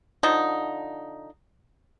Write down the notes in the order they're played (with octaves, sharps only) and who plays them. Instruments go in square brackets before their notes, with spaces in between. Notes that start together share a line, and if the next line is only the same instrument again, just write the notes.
[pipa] D3 F3 D#4